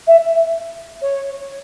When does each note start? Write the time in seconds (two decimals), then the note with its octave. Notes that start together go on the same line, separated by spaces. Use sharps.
0.07 E5
1.02 C#5